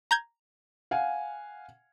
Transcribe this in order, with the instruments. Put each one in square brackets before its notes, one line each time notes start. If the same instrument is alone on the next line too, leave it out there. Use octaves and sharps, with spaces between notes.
[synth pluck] A#5 G6 G#6
[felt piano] F5 F#5 G#5